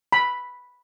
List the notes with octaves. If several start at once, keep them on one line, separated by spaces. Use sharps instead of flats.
B5